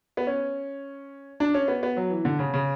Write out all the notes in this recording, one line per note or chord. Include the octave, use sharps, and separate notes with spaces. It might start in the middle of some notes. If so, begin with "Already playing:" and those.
B3
C#4
D4
C#4
B3
B3
F#3
E3
D3
C#3
C#3